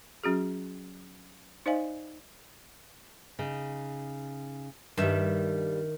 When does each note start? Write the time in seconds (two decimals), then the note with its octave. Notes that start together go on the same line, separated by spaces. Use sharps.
0.24 F#3 C#4 F#4 G#4
1.66 D#4 C5 D5 D#5 F5 G#5
3.39 C#3 D#4
4.97 G2 D#3 G3 E5